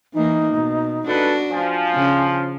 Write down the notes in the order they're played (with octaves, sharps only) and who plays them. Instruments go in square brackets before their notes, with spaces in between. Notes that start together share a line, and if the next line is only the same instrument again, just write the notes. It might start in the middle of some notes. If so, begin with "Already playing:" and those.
[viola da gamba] E3 A#3 [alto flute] D#4
[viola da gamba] B2
[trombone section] C#2 A4 B4 [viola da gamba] D4 F#4
[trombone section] F3 [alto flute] G#5
[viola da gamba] C#3